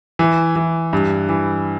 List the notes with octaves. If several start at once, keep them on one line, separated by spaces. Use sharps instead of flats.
E3
E3
G2
E3